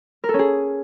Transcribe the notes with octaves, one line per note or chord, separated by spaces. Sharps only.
A#4
A4
C#4
G#4